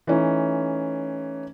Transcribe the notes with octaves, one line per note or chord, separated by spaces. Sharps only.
E3 A3 C#4 D#4